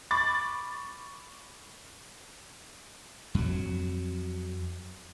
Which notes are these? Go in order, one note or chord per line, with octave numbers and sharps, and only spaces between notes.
B5 C#6 D6 A6
F2 F#3